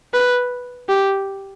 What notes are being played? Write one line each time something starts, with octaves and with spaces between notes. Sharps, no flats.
B4
G4